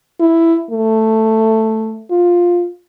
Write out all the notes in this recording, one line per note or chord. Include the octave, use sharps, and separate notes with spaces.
E4
A3
F4